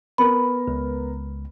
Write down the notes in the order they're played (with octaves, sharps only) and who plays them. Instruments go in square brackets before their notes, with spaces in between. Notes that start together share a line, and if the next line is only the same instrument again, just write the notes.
[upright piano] B3 A#4 [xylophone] B5
[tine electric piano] C#2